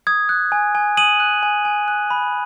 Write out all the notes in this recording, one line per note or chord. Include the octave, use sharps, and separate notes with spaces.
D#6 G#6
F#6
G#5
G#5
D#6 D#7 F#7
F#6
G#5
G#5
F#6
B5